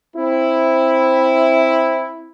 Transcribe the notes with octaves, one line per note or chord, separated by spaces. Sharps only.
C4 E4